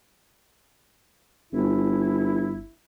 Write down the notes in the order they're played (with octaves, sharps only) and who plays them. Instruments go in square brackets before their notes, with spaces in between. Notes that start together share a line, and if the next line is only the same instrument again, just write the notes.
[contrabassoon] G1 [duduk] E4